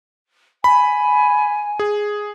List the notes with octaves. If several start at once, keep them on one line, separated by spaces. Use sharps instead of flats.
G#5 B5
G#4